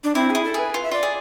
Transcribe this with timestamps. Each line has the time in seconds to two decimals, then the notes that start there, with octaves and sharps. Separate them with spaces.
0.04 D4
0.15 C4 E4
0.30 E4 G#4
0.45 A4
0.54 G#4 B4
0.74 F4
0.83 E5
0.91 F4 D5
1.03 G#4